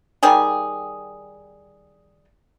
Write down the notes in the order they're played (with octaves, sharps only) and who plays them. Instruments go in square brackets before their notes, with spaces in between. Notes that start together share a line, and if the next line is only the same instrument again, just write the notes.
[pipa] D#3 G3 G#4